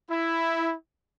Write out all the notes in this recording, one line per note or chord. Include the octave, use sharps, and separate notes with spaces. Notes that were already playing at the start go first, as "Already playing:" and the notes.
E4